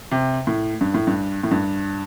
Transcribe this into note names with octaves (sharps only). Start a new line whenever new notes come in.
C3
A2
G2
A2
G2
A2
G2